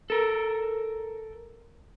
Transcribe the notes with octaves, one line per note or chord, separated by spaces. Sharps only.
A4 A#4